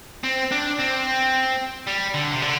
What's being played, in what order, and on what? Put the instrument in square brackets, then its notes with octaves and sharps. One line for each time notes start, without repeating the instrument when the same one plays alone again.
[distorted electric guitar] C4
D4
C4
G3
D3
C3
D3